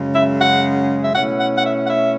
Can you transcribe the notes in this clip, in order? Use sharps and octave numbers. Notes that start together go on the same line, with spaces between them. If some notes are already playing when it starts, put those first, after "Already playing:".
Already playing: F#2 C#3 G#3
E5
F#5
E5
B2 A3 C#4 E4 F#5
F#5
F#5
E5
F#5
E5